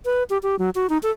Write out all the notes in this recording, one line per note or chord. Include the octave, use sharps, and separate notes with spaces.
B4
G4
G4
F#3
F#4
D#4
A4